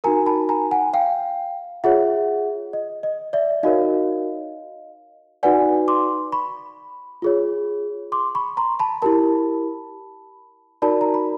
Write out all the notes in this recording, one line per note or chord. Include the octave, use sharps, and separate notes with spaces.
D#4 F#4 A#4 G#5 A#5
A5 B5
G#5 A#5
F#5 G#5
F5 G5
F4 G#4 C#5 E5 F#5
D#5
D#5
D5 E5
D#4 F#4 A#4 C#5 D#5 F5
D#4 F#4 B4 D5 F#5 G#5
C6 D6
B5 C#6
F4 G#4 C#5
C6 D6
B5 C#6
A#5 C6
A5 B5
E4 G4 A#4 A5 B5
D#4 F#4 A#4 D5 A5 B5
A#5
B5